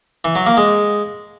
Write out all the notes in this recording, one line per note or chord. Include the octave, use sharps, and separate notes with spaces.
E3
F#3
A#3
G#3